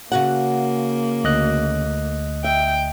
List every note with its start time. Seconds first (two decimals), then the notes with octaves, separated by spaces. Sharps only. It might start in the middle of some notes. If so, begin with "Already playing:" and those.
0.12 C#3 A#3 F#4 F#5
1.24 D2 D#5 F#6
2.44 E5 G5